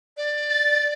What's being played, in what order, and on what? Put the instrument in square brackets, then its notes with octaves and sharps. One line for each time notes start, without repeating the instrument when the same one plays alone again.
[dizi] D5
[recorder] A6